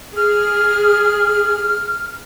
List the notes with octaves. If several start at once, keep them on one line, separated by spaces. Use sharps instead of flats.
G#4 F6